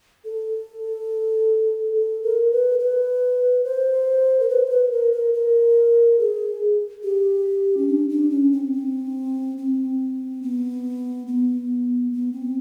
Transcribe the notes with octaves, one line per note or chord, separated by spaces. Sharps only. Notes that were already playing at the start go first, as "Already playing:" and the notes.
A4
A4
A#4
B4
B4
C5
A#4
B4
C5
B4
A#4
A#4
A#4
G#4
G4
C#4
D4
D4
C#4
C4
C4
C4
B3
B3
B3
C4